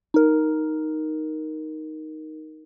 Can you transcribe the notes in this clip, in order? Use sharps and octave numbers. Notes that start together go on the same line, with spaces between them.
D#4 A#4